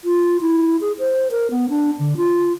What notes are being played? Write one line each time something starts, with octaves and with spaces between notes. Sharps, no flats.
F4
E4
G#4
C5
A#4
B3
D4
D3
F4